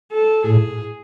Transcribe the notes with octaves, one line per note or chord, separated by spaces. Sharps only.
A4
A2 G#4